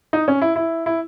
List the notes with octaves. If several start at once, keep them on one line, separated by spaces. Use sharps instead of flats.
D#4
C#4
E4
E4
E4